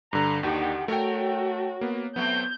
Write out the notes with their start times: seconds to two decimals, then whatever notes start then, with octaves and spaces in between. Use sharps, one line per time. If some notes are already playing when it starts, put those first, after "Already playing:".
0.13 G2 D3 A#5
0.43 D#2 D3 D#3 D#4 F#4 G4
0.88 A3 F#4 A#4 C#5 G5
1.81 A#3 B3
2.16 F#3 A3 B3 C4 G6